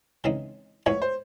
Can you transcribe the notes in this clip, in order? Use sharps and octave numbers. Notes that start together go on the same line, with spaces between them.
C#3 E3 G#3 C4 D#4
A2 F3 G#3 B3 C#5
C5